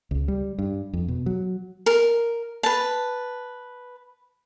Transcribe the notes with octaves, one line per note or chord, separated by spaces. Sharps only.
C#2
G3
G2
F2
B2
F#3
A#4
B4 A5